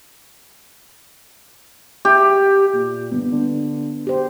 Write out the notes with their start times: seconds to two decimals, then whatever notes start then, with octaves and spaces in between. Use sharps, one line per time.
2.05 G4
2.74 A#2
3.12 G1 B3
3.32 D3
4.07 G4 C5